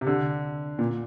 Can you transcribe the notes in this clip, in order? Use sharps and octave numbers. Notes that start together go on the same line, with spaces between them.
C3
D3
A#2